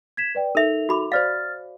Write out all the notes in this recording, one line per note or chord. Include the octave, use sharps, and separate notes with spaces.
G#6 B6 E7
B4 D5 G5
D#4 A4 A#4 E5 F7
F#4 B5 D6
C5 D5 F5 F6 A6